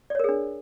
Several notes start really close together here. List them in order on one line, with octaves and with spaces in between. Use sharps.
D5 C#5 A#4 G#4 D4